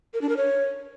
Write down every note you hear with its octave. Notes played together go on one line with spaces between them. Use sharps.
A#4
D4
A#4
C#5